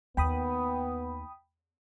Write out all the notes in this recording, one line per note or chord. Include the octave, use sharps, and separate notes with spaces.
D#2 B3 G5 B5 D#6